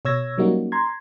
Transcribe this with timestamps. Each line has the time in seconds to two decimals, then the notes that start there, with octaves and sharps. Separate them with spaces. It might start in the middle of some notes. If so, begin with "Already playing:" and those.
0.05 B2 C#5 E6 G#6 A#6
0.38 F#3 G3 A#3 C#4 D#4 F#4
0.72 A#5 C6 G#6